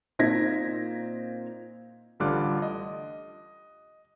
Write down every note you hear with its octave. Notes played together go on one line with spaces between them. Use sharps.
A#2 C4 D#4 G#6 A#6 B6
A1 D3 G3 F4 D6 F#6
D#5